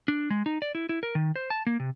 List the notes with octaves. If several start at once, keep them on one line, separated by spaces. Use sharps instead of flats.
D4
G#3
D#4
D5
E4
E4
A#4
D#3
C5
A5
A#3
C3